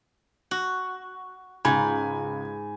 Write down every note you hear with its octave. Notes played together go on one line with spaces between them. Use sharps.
F#4
C#2 G#2 G#5 B5 G#6